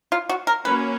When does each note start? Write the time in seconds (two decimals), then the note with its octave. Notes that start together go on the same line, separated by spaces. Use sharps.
0.12 F4
0.29 F#4
0.47 A#4
0.65 F#3 A#3 C#4 B4